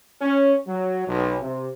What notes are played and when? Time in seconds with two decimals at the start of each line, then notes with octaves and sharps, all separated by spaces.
0.21 C#4
0.67 F#3
1.07 B1
1.40 C3